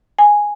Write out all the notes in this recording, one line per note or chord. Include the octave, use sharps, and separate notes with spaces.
G#5